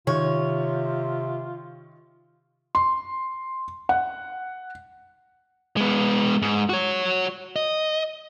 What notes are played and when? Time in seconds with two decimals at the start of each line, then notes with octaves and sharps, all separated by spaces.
0.07 C3 D#3 F4 C#5
2.75 C6
3.89 F#5
5.77 G#3 B3
6.42 G#2
6.69 F#4 C#5
7.56 D#5